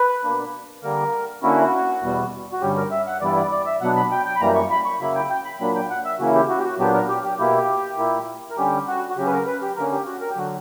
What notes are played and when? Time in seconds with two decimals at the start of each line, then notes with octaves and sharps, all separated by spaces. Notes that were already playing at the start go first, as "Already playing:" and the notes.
Already playing: B4
0.24 B2 A#3 D4
0.83 D3 G3 A#3 A#4
1.43 D3 A#3 C#4 E4 F#4
2.02 E2 B2 G3 B3
2.52 F#4
2.61 G2 D3 G3 C#4 G4
2.76 A#4
2.91 E5
3.07 F#5
3.21 G2 E3 G3 B3 E4 D5
3.36 D5
3.52 D5
3.66 E5
3.81 B2 F#3 B3 D4 F#5
3.96 B5
4.11 G5
4.25 G5
4.36 B5
4.41 F#2 E3 G3 A#3 A#5
4.55 C#6
4.70 B5
4.86 C#6
5.00 C#3 F#3 A#3 E4 B5
5.15 G5
5.30 G5
5.45 B5
5.60 A#2 F#3 A#3 D4 B5
5.75 G5
5.90 F#5
6.05 E5
6.19 C#3 E3 A#3 C#4 E4 F#4
6.34 G4
6.49 F#4
6.59 G4
6.64 F#4
6.79 A#2 F#3 B3 D4 G4
6.94 A#4
7.09 G4
7.24 G4
7.38 B2 A#3 E4 G4
7.98 A#2 A#3 E4
8.50 A#4
8.57 D3 G3 C#4 G4
8.87 F#4
9.10 F#4
9.17 C#3 F#3 C#4 G4
9.26 B4
9.32 A#4
9.47 B4
9.62 G4
9.76 D3 A#3 C#4 A#4
9.92 G4
10.06 F#4
10.21 A#4
10.30 G4
10.36 D3 F#3 F#4